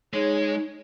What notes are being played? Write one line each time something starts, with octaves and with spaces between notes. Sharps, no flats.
G#3 D#4 G#4 C#5